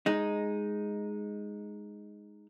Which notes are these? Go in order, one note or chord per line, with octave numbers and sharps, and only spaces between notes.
G#3 D#4